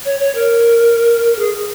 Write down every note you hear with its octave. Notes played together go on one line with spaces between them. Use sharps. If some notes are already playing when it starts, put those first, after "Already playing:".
C#5
C#5
A#4
A#4
G#4